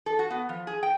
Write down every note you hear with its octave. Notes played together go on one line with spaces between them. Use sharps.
A4
F#4
B3
F3
G#4
G5